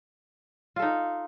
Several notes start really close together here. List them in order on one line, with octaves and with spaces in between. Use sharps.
F4 A4 D#4